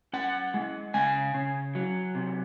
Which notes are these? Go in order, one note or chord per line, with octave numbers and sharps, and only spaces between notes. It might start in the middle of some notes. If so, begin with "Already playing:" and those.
C#4 F#5
G#3
C#3 G#5
C#3
F#3
C3